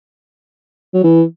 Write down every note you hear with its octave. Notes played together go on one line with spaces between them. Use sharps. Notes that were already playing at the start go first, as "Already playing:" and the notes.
F#3
E3